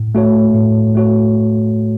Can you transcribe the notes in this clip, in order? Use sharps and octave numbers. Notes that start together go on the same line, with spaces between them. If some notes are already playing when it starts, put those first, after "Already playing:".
Already playing: A2
A3 F#4 C#5
A2
A3 F#4 C#5